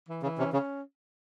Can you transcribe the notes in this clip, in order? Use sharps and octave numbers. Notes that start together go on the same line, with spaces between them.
E3
C#3 E3
C3 C#4
C#3 C#4